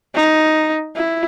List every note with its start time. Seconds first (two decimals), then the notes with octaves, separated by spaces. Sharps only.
0.15 D#4
0.96 E4